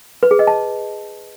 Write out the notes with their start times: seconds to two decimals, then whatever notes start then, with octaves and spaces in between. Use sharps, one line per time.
0.23 B4
0.31 G#4
0.39 D#5
0.47 A5